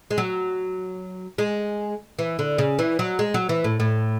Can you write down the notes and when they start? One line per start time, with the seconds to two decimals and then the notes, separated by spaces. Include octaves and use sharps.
0.11 G#3
0.18 F#3
1.38 G#3
2.19 E3
2.39 D3
2.58 C#3
2.79 E3
2.99 F#3
3.19 G#3
3.34 F#3
3.49 E3
3.64 A2
3.80 A2